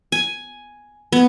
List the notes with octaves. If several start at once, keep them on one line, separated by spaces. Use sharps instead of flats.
G#5
B3